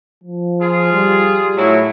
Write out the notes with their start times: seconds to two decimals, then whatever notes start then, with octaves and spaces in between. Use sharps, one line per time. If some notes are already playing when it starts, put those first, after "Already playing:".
0.23 F3
0.61 F4 G#4
0.92 G3
1.57 A2 F#3 E4